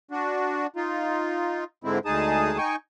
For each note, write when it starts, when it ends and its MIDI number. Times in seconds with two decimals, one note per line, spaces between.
0.11 0.67 62
0.11 0.67 66
0.76 1.64 63
0.76 1.64 65
1.84 1.99 44
1.84 1.99 50
1.84 1.99 56
1.84 1.99 60
1.84 1.99 64
2.05 2.58 38
2.05 2.58 56
2.05 2.58 63
2.05 2.58 68
2.05 2.58 81
2.05 2.58 87
2.58 2.76 63
2.58 2.76 79
2.58 2.76 80
2.58 2.76 85